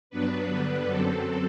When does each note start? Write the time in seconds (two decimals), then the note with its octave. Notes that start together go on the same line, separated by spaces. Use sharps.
0.10 G2 F#3 B3 D4 B4
0.48 D3 G3 B3 D4
0.84 F#2 F#3 C4 A4